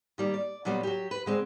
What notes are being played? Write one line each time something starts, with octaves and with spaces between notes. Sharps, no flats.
D#3 G3 A#3
D5
A#2 F#3 G3 B3 D#4
F#3 G4
B4
D3 G#3 C4